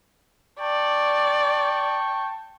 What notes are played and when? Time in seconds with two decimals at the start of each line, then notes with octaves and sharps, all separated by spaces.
0.60 D5 G5 A5 C#6